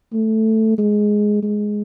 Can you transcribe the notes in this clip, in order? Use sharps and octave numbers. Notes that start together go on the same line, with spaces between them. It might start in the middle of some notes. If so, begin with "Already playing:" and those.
A3
G#3
G#3